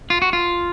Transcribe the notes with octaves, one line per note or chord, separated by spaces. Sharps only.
F4
F#4
F4